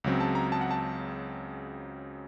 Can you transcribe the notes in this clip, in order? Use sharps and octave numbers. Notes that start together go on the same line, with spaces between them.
C#2 C#3 F#3 C4
A5
A#5
A5
F#5
A5